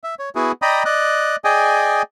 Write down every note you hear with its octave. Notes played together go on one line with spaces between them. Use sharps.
E5
C#5
B3 E4 F#4 G#4
D5 D#5 G5 A#5 B5 D#6
D5 D#5 F#6
G#4 D5 D#5 G5 G#5